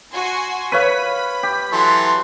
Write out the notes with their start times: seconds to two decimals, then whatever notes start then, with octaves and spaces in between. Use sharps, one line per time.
0.13 F#4 G#5 C6
0.72 B4 C#5 F5 B5 B6
1.43 G4
1.72 E3 F#3 A4 C6